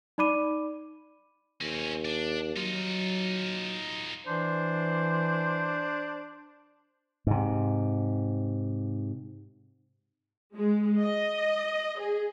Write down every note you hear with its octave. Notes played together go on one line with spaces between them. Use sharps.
D#4 D5 B5 D6 D#7
D#2 C4 C#4
D4
F#3 D#4 F4
E3 D4 C5
G#2 C3
G#3
D#5
G#4